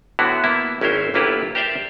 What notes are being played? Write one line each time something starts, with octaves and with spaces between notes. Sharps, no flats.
A2 D3 B3 E4 F#4
A#3 B3 E4
G#1 C#4 E4 A#4 C5
G1 A#3 E4 F4 G4 B4
G4 A#4 C5 D5 E5